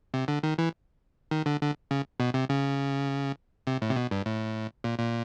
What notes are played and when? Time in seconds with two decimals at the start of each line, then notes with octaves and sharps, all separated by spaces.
0.14 C3
0.28 D3
0.43 D#3
0.58 E3
1.31 D#3
1.46 D3
1.61 D3
1.91 C#3
2.20 B2
2.34 C3
2.49 C#3
3.67 C3
3.82 A2
3.90 C3
3.96 B2
4.11 G2
4.26 A2
4.84 A#2
4.99 A#2